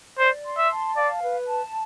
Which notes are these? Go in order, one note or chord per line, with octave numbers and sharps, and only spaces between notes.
C5 D5
C6
E5
A5
D5 F5
B4
A5